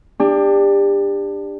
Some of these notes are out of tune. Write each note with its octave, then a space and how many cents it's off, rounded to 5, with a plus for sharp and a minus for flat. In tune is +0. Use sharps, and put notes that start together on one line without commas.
D4 +10 G4 +30